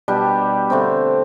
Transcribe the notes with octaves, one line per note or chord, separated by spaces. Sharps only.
B2 G3 D4 G4
D3 A3 C4